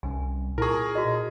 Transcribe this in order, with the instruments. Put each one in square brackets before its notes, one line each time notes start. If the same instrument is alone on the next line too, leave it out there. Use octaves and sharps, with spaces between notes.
[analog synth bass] C2 [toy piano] C#4 B4 G#5
[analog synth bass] A#2 [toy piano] E4 A5 C#6 [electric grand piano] G#4 A#4
[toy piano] F#4 B4 D#5